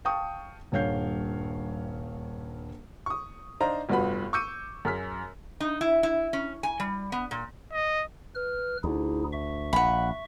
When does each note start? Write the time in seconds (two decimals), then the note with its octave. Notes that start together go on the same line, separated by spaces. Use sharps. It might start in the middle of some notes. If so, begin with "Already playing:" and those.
0.05 F5 G5 A5 C#6 D#6
0.72 D#1 G2 C#5 F5 G6 C7
3.06 C#6 D#6
3.60 D4 D#4 C5 F5 A#5
3.89 F1 G2 F3 B3 F#4 B5
4.33 C#6 D6 E6 G6 C#7 D#7
4.85 F#2 G#4 F6 B6
5.60 D#4
5.81 E4
6.03 E4
6.33 C#4
6.63 G#5
6.80 G3
7.12 B3
7.31 A#2
7.73 D#5
8.35 B4 F6
8.84 D2 D#4 E4 G#4
9.33 E5 C#6
9.73 A#1 F#5 B5